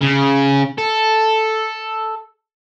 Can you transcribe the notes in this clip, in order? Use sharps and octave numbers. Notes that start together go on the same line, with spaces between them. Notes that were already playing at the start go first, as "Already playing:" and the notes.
C#3
A4